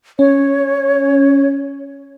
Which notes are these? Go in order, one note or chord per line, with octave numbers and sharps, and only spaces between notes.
C#4 C#5